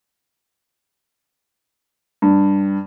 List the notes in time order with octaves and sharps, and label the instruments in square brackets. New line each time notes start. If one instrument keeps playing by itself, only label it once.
[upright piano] G2